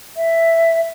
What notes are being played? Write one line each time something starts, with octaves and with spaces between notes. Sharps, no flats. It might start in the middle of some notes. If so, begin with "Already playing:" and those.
E5